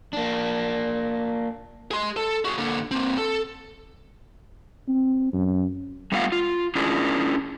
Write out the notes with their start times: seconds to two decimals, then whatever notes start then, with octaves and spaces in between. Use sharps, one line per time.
0.13 A#3 D4
1.91 G#4 C6
2.16 A4
2.45 F#4 G#4
2.58 D3 A#3
2.91 A#3 C4
3.18 A4
4.88 C4
5.33 F#2
6.12 G3 A3 B3 F4 F5 F#5
6.32 F4
6.75 C#4 D4 E4 F4 G#4 A#4